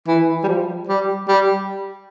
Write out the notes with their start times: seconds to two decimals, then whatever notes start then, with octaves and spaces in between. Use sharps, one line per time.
0.08 E3
0.43 G3
0.48 F3
0.88 G3
1.28 G3